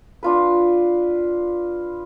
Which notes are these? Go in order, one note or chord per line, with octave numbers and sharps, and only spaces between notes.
D4 F4 B4